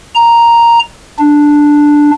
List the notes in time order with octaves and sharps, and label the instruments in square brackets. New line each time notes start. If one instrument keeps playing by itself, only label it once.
[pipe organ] A#5
D4